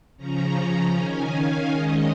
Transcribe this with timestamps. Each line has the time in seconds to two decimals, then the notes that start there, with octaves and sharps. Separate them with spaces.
0.17 C#3 F3 C#4 A#5
0.55 A#5
0.93 D#3 C#4 G#5
1.31 F5
1.69 D#3 G#3 C#4 D#5